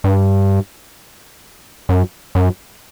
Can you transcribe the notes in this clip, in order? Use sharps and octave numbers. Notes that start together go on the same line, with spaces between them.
G2
F#2
F#2